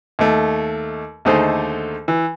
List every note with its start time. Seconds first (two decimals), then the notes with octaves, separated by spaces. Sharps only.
0.19 D#2 A3
1.25 D#2 D3 A3 D#4 G#4 C5
2.08 E3